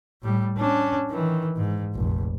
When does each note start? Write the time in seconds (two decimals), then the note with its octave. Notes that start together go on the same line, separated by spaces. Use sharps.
0.22 A2 G3
0.57 C#4 D4
1.10 D#3 E3
1.57 G#2
1.94 F1 A#1